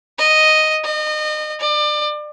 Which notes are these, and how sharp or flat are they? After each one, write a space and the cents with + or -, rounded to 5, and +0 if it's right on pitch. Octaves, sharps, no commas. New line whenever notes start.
D#5 +0
D#5 -30
D5 +30